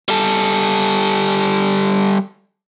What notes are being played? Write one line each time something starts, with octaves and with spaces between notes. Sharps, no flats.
G3 A4